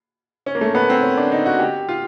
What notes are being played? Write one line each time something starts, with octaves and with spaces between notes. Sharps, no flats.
C#4
A#3
A3
B3
C4
C#4
D4
D#4
F#4
G4
F4